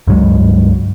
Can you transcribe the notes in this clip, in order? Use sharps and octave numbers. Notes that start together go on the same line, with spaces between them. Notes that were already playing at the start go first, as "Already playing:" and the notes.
C#2 G2 F#3 G#3